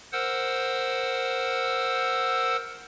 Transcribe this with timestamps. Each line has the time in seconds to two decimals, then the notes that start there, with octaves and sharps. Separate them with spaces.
0.13 A#4 C5 F#5 E6